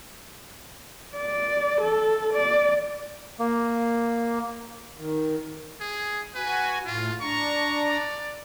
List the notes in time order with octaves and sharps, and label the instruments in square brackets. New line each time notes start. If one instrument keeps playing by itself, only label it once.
[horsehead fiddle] D5
A4
D5
[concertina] A#3
[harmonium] D#3
[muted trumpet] G#4
[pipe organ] F#4 G#5 [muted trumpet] B4
[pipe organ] A2 [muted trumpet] F4
[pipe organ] D4 A#5 [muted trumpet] C#6
[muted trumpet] D5